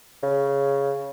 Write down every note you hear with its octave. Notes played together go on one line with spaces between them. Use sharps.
C#3